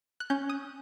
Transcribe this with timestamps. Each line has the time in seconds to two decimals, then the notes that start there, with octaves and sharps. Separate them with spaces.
0.20 F#6
0.30 C#4 G6
0.49 D#6